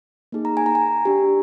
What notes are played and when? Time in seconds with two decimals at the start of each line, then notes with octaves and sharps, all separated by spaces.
0.32 A#3 D#4 G#4
0.45 A#5
0.57 G#5
0.66 A#5
0.75 G#5
1.05 D4 G4